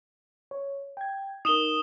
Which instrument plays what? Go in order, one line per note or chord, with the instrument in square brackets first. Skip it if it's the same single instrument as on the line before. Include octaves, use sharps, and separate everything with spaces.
[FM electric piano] C#5
G5 G#6
[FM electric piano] D#4 A#4 [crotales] D#6 E7 G7